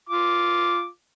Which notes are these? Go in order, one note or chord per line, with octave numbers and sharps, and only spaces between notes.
F4 D6